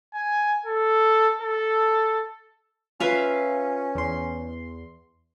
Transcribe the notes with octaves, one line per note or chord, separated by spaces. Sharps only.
G#5
A4
A4
C#4 F4 B4 E5 F5
E2 C6